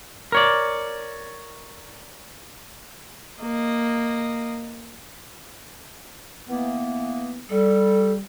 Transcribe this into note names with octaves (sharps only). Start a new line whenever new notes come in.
A#4 C#5 D5
A#3 D#5
E3 A#3 B3
G3 A4